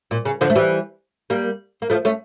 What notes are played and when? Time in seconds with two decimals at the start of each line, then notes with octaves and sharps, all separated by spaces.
0.11 A#2
0.25 C#3
0.41 D3 F3
0.50 A3
0.55 E3 G3
1.30 G3 A#3
1.82 A#3
1.90 F3 A3
2.05 A3 C#4